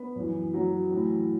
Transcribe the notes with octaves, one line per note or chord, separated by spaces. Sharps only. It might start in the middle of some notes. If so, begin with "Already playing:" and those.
Already playing: B3 B4
F#2 E3
F#3 F#4
A2 E3